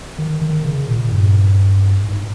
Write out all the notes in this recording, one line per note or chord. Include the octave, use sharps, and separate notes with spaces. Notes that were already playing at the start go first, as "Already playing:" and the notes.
D#3
D#3
C#3
A#2
G2
G#2